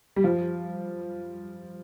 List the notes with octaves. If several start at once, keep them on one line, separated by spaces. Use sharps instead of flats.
G3
F3